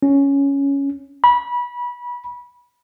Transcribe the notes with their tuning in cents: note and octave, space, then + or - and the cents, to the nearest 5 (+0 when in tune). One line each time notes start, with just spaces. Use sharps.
C#4 +5
B5 -25